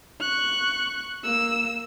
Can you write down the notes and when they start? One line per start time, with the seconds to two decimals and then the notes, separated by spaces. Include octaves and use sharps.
0.21 C#6 F#6
1.24 A#3 E6